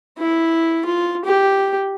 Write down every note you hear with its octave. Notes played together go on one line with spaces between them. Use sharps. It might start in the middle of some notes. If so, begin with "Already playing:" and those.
E4
F4
G4